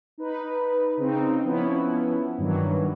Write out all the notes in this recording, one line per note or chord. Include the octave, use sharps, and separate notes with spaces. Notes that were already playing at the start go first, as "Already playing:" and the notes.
D#4 B4
C#3 C4 D#4
F3 B3 C#4 E4
G2 D#3 E3 F#3